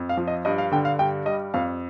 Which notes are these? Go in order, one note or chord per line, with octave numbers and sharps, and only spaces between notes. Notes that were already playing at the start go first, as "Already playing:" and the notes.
Already playing: F2
F5
F3
D#5
G2 D#5
F5
D3 G5
F5
G2 G5
G3 D#5
F2 F5